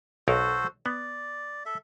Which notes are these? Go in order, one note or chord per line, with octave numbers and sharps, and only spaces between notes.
B1 D#4 F#4 A4 A#4 C5
B3 D5
A4 E5